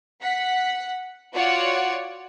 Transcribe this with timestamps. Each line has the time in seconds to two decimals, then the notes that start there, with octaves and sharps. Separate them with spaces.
0.21 F#5 B6
1.35 F4 F#4 C#5 D5 F#5